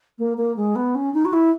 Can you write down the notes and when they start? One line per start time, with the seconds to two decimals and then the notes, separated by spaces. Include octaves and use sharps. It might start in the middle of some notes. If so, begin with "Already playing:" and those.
0.19 A#3
0.37 A#3
0.56 G#3
0.76 B3
0.95 C#4
1.14 D#4
1.25 F#4
1.33 E4